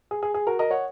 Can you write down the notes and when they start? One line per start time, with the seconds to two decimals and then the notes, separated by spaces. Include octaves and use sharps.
0.11 G#4
0.23 G#4
0.34 G#4
0.47 F#4 A#4
0.59 A#4 D#5
0.71 C#5 F#5